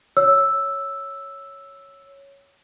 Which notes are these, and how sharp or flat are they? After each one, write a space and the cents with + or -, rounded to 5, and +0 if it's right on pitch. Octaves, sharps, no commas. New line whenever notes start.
C#5 +0 E6 +0